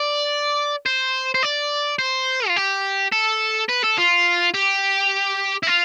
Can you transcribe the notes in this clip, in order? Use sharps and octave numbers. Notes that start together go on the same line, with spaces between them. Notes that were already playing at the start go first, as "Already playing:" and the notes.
Already playing: D5
C5
C5
D5
C5
F4
G4
A4
B4
A4
F4
G4
E4
F4